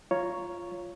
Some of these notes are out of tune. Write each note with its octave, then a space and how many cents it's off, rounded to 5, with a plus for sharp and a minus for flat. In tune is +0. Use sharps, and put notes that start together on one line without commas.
F4 +0 C#5 +0 A#5 +0